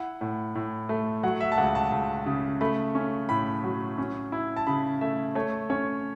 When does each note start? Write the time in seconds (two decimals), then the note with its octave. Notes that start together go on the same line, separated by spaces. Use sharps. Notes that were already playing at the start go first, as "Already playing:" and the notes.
Already playing: E4 F#5
0.21 A2
0.55 A2
0.89 A3
1.23 F#3 F#5
1.41 E5
1.52 A5
1.58 C#2 F#5
1.75 A5
1.92 C#2
2.26 C#3
2.61 A3 B5
2.95 C#4
3.29 A2 B5
3.64 F#3
3.98 C#4
4.32 E4
4.56 A5
4.67 C#3 B5
5.01 A3 E5
5.35 A3 C#5
5.70 C#4 C#5